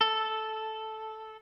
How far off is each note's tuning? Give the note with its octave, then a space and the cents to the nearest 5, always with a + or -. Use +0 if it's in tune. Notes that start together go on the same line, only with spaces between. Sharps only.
A4 -5